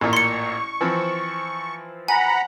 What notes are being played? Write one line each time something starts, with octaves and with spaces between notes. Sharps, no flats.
A1 A#2 C#6
C6 C#7
E3 F3 C4
F#5 G#5 A#5 B5